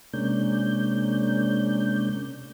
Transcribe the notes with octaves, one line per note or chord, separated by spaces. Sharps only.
C3 G#3 A#3 C#4 D4 G6